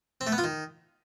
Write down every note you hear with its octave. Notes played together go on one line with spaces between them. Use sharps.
C4
A3
B3
F4
D#3